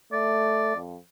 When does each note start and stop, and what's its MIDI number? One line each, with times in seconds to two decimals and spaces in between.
0.12 0.76 57
0.12 0.77 74
0.76 0.97 41